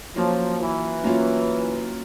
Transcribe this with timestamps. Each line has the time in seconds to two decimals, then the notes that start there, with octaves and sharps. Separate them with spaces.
0.16 F3 F#3 A#3 C#4 F4
0.60 E3
1.04 F#3 A#3 C#4 F4